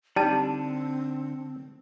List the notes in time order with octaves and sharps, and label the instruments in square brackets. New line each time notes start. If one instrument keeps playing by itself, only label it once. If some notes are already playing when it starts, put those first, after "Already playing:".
[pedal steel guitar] D3 D4 [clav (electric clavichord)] G3 [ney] C4 [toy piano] D#4 A5